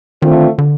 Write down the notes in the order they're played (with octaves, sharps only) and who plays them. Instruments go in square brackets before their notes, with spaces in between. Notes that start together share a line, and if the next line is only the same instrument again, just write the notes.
[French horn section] D3 A3 C4 F4 [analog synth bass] D#3
[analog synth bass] D3